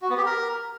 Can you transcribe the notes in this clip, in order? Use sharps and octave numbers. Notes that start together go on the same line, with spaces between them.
F#4
B3
G4
A#4